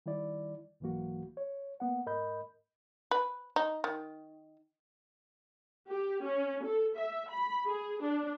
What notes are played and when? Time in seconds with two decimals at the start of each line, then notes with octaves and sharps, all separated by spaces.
0.06 D#3 G3 E4 D5
0.80 C2 G#2 E3 F#3 A#3 F#4
1.37 C#5
1.80 A#3 B3 F#5
2.06 G#2 A#4 D#5 B5 G6
3.11 B4
3.56 D#4
3.84 D#3
5.89 G4
6.23 C#4
6.64 A4
6.97 E5
7.31 B5
7.67 G#4
8.03 D4